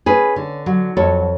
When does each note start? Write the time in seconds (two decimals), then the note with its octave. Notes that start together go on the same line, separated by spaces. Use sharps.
0.06 C#4 G#4 B4
0.36 D3
0.66 F#3
0.97 F2 A4 C#5